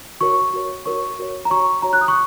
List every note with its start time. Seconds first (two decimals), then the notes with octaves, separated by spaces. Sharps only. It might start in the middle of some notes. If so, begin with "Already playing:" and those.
0.21 F#4 A#4 C#5 C#6
0.53 F#4 A#4 C#5
0.86 F#4 A#4 C#5 C#6
1.19 F#4 A#4 C#5
1.45 A#5
1.50 F#4 C#5 C#6
1.82 F#4 C#5 A#5
1.93 F#6
2.01 D#6
2.08 C#6